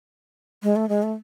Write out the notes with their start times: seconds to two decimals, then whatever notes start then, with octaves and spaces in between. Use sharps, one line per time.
0.63 G#3
0.76 A3
0.89 G#3
1.03 A3